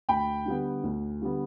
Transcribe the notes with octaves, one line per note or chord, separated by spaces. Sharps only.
D2 G5 B5
D3 G3 B3
D2
D3 G3 B3